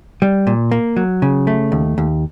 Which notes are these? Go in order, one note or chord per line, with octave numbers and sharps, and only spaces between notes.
G3
A#2
A#3
F#3
C#3
A3
D#2
D#2